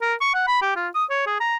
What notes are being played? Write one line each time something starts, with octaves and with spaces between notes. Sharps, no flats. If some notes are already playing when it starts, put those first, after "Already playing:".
A#4
C#6
F#5
B5
G4
F4
D#6
C#5
G#4
A#5